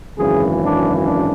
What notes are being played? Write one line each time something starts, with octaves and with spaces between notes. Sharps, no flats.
G#1 F#2 C#3 E3 G#4
D4
D4